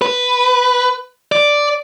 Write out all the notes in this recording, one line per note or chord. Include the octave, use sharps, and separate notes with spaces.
B4
D5